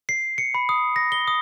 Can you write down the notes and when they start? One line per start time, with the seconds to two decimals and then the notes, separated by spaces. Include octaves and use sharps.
0.09 C7
0.38 C#7
0.54 B5
0.69 D#6
0.96 A#6
1.12 G7
1.28 D#6